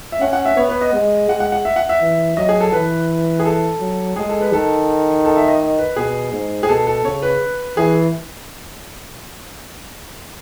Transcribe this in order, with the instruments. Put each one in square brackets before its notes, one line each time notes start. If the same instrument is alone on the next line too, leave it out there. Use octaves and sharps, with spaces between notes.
[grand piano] E5
[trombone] C#4 [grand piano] F#5
[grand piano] F#5
E5
[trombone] B3 [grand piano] C#5
[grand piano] B4
D#5
[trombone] G#3
[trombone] G#3 [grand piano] F#5
[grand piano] F#5
F#5
E5
F#5
E5
[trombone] E3
[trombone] F#3 [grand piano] D#5
[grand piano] G#4
A4
[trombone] E3 [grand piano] B4
[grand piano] G#4
A4
[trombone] F#3
[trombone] G#3 [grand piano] G#4
[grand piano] A4
B4
[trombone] D#3 [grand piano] A4
[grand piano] A4
E5
D#5
D#5
B4
[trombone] B2 [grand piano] G#4
[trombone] G#2
[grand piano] G#4
[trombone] B2 [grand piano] A4
[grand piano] A4
[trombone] C#3 [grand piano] C#5
[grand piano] B4
[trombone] E3 [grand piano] G#4